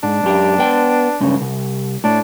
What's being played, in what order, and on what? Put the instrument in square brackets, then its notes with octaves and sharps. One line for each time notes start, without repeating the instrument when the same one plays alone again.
[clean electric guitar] G#2 [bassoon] D4
[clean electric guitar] F#2 G4
B3 G5
C#2 G2 C#3
C2
[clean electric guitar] A2 [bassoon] D4